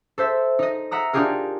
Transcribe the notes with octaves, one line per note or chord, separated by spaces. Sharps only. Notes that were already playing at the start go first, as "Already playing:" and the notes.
A4 C5 E5
D#4 D#5
E5 F#5 A#5 D#6
D4 D#4 F4 G4 G#4 A#4